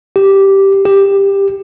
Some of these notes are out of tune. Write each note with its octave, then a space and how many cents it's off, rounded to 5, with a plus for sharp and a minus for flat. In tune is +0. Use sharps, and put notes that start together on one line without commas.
G4 -5
G4 +15